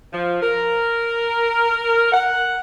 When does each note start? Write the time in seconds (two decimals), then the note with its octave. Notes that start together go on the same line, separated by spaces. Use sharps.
0.13 F3
0.42 A#4
2.12 F#5